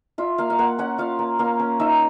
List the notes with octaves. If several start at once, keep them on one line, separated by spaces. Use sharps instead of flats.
F4 E5
A#3 F5
F5
A#3 F#5
C#4 F#5
F4 F5
A#3
A#3 F5
C#4
D#4 E5